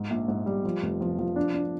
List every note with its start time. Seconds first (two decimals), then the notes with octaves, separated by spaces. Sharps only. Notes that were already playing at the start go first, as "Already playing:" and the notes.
Already playing: G#2
0.10 A#1
0.28 G#2
0.46 G3
0.65 F3
0.82 F1
1.01 F3
1.19 F3
1.36 D4
1.54 D4